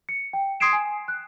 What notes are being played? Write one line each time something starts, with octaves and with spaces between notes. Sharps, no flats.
C#7
G5
C6 D#6 G#6 C7 D7 E7
G#5
F#6